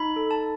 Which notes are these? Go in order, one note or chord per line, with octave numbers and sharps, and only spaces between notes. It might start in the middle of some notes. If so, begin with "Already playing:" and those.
Already playing: D#4 B5
A4
A5